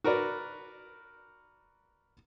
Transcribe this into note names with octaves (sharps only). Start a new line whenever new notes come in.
F#4 A#4 B4 D5